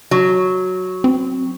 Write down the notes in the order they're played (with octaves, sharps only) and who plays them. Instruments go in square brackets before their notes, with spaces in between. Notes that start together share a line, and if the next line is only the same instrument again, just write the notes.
[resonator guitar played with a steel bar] F#3
[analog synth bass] C4